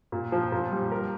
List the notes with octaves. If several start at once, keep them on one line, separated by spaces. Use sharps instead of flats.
A#2
F3
A#2
G3
A#4